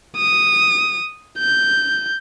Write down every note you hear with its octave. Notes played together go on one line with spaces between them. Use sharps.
D#6
G6